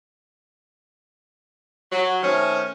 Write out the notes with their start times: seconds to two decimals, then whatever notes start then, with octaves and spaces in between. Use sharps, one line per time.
1.92 F#3
2.23 D#3 A3 C4 C#4